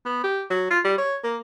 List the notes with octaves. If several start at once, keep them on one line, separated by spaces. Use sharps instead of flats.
B3
G4
F#3
F4
G3
C#5
A#3